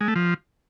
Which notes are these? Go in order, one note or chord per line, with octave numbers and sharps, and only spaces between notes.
G#3
A3
F3